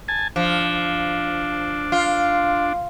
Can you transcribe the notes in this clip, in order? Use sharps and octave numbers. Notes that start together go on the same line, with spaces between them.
G#5 A5
F3 D4
F4